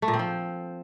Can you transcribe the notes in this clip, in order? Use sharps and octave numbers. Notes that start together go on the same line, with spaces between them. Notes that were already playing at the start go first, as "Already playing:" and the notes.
A3
A#2
C4
F3